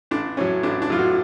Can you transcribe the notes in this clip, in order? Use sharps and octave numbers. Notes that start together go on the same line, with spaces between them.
A1 D4
A2 F#3 C#4
A1 D4
D4
A2 F#3 F4
F#4